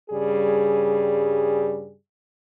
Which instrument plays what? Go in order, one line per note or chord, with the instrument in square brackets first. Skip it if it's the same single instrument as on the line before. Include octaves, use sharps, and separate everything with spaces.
[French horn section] G2 C#3 G3 G#4